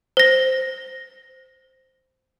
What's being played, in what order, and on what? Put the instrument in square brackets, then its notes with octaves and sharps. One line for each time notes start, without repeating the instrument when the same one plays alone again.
[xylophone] C5 A#6